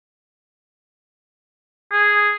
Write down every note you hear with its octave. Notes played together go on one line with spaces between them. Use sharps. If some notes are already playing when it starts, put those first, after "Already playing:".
G#4